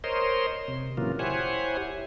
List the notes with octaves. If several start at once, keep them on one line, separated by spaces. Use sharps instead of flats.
A#4 C5 C#5 D#5 C6
C3
A#2 C#3 E3 F#3 A#3 F4
E4 G4 C5 C#5 F#5 G#5